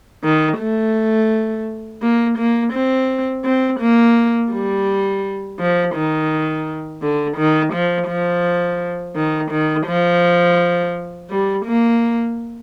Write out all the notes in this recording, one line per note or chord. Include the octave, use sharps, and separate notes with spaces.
D#3
A3
A#3
A#3
C4
C4
A#3
G3
F3
D#3
D3
D#3
F3
F3
D#3
D#3
F3
G3
A#3